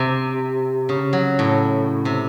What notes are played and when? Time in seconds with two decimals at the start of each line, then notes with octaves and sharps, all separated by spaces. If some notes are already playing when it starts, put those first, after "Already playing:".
Already playing: C3
0.89 C#3
1.13 F#3
1.39 A2
2.05 C3